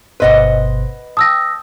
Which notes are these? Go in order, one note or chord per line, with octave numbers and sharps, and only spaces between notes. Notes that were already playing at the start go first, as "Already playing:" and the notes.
G1 B2 B4 C5 D#5 F#5
G5 A5 D#6 E6 A#6